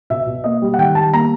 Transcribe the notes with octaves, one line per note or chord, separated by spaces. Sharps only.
B2 E5
B2
A#3 D#5
G3
F#5
D#3 G5
G3 A5
A#3 A#5